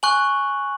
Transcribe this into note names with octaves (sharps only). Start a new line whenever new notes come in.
G#5 C#6 F#6 F#7